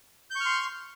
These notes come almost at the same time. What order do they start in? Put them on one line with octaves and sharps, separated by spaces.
G6 C#6 F6 C6